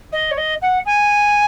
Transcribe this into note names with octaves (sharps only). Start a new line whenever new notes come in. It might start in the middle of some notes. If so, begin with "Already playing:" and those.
D#5
C#5
D#5
F#5
G#5